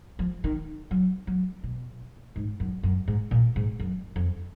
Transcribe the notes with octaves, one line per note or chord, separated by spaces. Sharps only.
F3
D#3
F#3
F#3
B2
G#2
F#2
F#2
G#2
A#2
G#2
F#2
F2